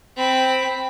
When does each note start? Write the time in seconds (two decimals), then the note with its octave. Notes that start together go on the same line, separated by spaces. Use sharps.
0.16 C4 B5